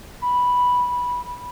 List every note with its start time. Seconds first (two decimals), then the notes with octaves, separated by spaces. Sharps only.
0.21 B5